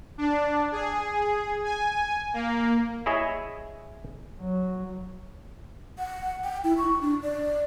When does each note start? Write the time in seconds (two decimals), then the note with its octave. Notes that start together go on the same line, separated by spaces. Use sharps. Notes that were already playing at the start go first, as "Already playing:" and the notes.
0.18 D4
0.72 G#4
1.64 G#5
2.34 A#3
3.06 E4 G#4 C#5 D#5 E5 G#5
4.40 F#3
5.98 F#5
6.44 G5
6.64 E4
6.78 C#6
7.01 D4
7.23 D5